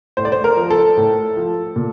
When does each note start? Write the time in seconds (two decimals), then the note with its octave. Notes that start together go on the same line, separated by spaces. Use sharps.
0.17 A2 C5
0.25 D5
0.32 C5
0.44 A#4
0.57 F3
0.70 A4
0.97 A2
1.36 F3
1.76 A#2